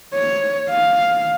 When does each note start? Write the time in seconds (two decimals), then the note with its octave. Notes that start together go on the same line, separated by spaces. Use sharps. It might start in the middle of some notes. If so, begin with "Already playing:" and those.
0.14 C#5
0.70 F5